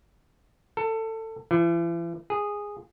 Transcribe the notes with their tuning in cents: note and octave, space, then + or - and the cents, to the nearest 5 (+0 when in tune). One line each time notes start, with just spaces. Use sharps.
A4 +20
E3 +40
G#4 -10